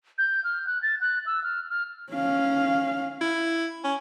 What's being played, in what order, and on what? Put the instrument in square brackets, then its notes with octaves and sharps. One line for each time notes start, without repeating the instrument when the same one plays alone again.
[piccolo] G6
F6
F#6
A6
F#6
E6
F6
F6
[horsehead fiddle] C#4 F5
[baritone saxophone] E4
C#4